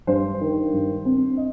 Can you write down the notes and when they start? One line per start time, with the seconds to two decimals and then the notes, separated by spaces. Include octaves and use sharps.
0.07 G2 C5
0.41 D#3
0.73 G2
1.05 C4
1.37 D#5